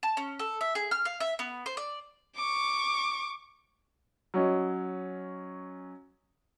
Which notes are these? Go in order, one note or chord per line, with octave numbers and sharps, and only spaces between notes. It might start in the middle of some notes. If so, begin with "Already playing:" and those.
A5
C#4
A4
E5
G#4
F6
F5
E5
B3
C5
D5
C#6 D6
F#3 C#4 D#5